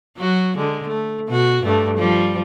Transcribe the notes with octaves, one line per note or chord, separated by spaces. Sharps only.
F#3 F#4
D3 G#3
A3
B2 F#4
G2 G3 A3
F3 G3